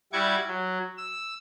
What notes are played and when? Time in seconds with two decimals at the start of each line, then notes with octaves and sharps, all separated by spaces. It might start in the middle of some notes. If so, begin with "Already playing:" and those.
0.13 G3 E4 F#4 C#6 D6 G#6
0.47 F#3
0.97 E6